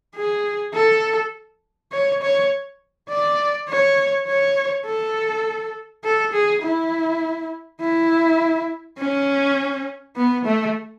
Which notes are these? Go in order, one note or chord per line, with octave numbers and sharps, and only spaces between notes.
G#4
A4
C#5
C#5
D5
C#5
C#5
A4
A4
G#4
E4
E4
C#4
B3
A3